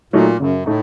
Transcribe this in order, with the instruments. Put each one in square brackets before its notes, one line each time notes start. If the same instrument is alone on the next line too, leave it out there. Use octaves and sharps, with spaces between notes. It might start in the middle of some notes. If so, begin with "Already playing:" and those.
[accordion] A#2 [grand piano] F#3 A3 D#4
[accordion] F#2 [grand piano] C#3
[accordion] A2 [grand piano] A3 D#4